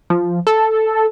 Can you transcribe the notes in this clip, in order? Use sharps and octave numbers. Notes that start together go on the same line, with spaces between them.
F3
A4